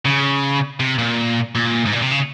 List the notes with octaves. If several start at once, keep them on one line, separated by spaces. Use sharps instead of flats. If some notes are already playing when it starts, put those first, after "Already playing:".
C#3
C3
A#2
A#2
G#2
A#2
C3
C#3